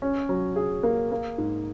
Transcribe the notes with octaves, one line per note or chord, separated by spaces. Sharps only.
C#4
F#3
G#4
A#3
A#3
G#2